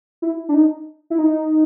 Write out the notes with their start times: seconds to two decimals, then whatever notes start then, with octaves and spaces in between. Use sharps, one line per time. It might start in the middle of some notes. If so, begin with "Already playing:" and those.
0.22 E4
0.49 D4
0.54 D#4
1.10 E4
1.19 D#4